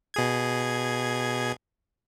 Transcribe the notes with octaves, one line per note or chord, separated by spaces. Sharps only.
B2 G#4 G#6